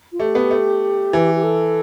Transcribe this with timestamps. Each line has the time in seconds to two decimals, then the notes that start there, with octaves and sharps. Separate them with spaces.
0.12 F4
0.20 A3 G4
0.35 B3
0.51 A3
1.13 E3
1.36 G4
1.44 A4